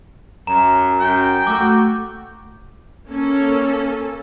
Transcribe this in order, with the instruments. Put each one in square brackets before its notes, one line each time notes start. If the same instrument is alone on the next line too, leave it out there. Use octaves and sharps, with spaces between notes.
[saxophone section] F#2 [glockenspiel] A#5
[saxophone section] F#2 [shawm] G5
[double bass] A3 [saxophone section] F#4 [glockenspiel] D6
[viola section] A#3 C#4 A4